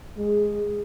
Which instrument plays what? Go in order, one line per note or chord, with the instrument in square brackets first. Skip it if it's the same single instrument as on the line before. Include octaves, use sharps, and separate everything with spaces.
[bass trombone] G#3 [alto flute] G#4